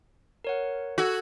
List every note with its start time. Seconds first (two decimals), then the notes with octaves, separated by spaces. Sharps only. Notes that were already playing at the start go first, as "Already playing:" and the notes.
0.44 A#4 C#5 F#5
0.98 F#4 A4 E6 G#6